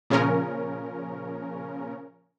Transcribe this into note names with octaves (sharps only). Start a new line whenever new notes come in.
A#2 C#3 F3 C#4 A#4